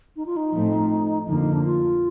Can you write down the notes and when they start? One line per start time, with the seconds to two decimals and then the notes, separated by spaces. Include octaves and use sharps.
0.16 D#4
0.26 F4
0.36 D#4
0.53 A2 F3 A3 C4
1.28 F2 D3 F3 A#3 D#4
1.40 D#4
1.53 D4
1.65 F4